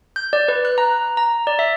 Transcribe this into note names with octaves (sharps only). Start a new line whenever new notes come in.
G6
D5
B4
F#6
A#5
A#5
D5
E5